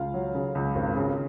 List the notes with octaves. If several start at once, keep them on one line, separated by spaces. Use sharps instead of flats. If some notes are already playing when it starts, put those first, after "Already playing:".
Already playing: C#2 F4 F5
F#3
C#3
C#2
G#1
C#3